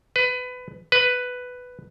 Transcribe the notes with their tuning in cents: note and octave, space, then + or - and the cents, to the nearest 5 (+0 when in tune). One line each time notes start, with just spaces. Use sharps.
B4 +20
B4 +5